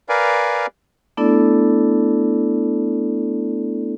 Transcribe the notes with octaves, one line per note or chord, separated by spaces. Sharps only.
A#4 B4 D5 F5 G#5
A3 B3 D4 E4 A4 D5